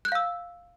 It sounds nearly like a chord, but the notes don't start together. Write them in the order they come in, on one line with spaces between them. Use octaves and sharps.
F#6 G6 F5 E6